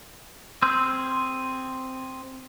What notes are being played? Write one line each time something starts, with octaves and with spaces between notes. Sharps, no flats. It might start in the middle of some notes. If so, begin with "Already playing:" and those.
C4 G#4 C6 E6 G6